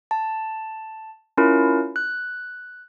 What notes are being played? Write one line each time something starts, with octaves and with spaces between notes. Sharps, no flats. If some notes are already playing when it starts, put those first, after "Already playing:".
A5
C#4 E4 F4 A#4
F#6